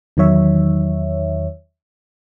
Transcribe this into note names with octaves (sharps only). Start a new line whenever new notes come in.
E2 D#3 F#3 C#5 E5